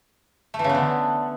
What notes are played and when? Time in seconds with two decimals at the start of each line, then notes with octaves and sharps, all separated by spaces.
0.54 A3
0.59 E3
0.64 C#3
0.69 B3
0.75 D3